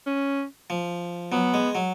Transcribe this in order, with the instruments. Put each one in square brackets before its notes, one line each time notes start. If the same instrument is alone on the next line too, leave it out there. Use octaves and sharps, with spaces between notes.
[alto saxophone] C#4
[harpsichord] F3
[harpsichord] F#3 [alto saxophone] B3
[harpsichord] G#3
F#3